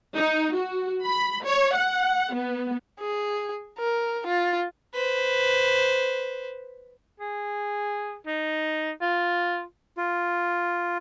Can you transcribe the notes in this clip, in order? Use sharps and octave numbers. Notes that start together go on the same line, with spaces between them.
D#4
F#4
B5
C#5
F#5
B3
G#4
A#4
F4
B4 C5
G#4
D#4
F4
F4